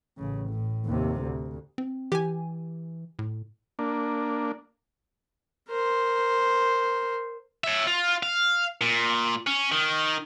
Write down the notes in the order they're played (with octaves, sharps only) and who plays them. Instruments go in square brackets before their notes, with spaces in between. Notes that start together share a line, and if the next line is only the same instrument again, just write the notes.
[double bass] A1 C#3
A2
D#2 C3
D2
[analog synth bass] C4
[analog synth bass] E3 [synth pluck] G4 G#5
[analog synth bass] A2
[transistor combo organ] A#3 D4
[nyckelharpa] A#4 C5
[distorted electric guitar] C#5 E5
F4
F5
A#2
C#4
D#3